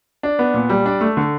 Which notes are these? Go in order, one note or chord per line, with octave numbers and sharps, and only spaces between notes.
D4
B3
A#2
G3
D4
A3
D3